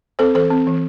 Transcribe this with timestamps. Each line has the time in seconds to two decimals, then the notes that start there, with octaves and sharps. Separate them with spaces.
0.19 C4 A4 C5
0.35 E3 A4 C5
0.50 C4
0.67 E3